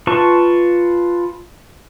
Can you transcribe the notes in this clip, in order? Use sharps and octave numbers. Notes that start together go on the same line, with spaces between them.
F4 B4 A5 C#6